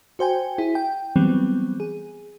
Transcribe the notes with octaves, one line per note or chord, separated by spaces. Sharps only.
F#4 C5 G5 G#5
E4 G#4
G5
E3 F#3 G3 B3 C4
G#4